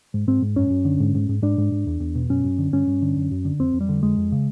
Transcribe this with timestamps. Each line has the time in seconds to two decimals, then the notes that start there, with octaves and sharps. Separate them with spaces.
0.14 G#2
0.27 G#2 C4
0.42 G#2
0.56 F#2 C#4
0.70 F#2
0.85 D3
1.00 G#2
1.15 G#2
1.29 G#2
1.42 G#2 D4
1.58 G#2
1.72 G#2
1.87 E2
2.00 E2
2.15 B2
2.29 F#2 C#4
2.44 F#2
2.58 D3
2.73 G2 C#4
2.87 G2
3.02 D3
3.17 F#2
3.31 F#2
3.45 D3
3.59 F2 C4
3.73 F2
3.81 G3
3.89 D3
4.03 F2 G#3
4.17 F2
4.32 C#3